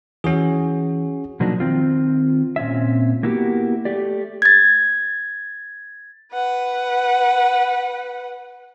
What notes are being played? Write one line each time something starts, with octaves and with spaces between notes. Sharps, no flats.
E3 C#4 F#4 G#4
B2 F3 F#3 A#3 D4 D#4
D#3 C4 F4
A#2 C4 C#4 E5
A#3 B3 E4 F#4 G4 A#4
A3 G4 D5
G#6 A6
B4 F#5